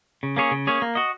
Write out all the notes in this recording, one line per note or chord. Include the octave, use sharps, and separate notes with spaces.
C#3
A#3 C#4 G#4 C#5
C#3
A#3 C#4 G#4 C#5
A#3
F#4 D#5